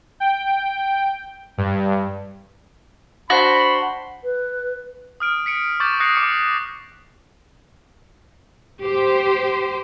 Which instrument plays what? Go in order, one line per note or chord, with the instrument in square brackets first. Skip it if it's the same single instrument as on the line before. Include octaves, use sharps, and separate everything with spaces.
[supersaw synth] G5
G2
[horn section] D4 C5 B5 [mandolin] F#4
[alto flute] B4
[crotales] D#6 F6 D7
B6 C#7 D7
C#6 D6 G6 A6 F#7
D#6 F#6 A#6 C7 C#7
D6 C#7
[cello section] G4 C5